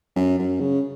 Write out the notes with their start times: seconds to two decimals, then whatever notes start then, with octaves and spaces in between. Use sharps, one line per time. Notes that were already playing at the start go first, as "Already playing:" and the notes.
0.16 F#2
0.38 F#2
0.60 C#3